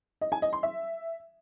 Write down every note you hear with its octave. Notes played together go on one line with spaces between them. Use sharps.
D#5
G#5
D#5
C6
E5